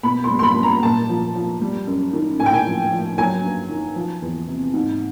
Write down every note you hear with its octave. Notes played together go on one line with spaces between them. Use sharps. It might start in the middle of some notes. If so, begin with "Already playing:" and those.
B2 B5
C6
G3
C6
B5
G3
A#5
A#2 A5
F3
F3
G3
F#2
D#3
A2 G#5
G5
G#5
F3
F3
F#3 G#5
G2
D#3
F3
E2
C3
G#2